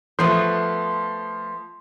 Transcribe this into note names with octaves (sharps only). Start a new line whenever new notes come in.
F3 A3 B3 A4 C6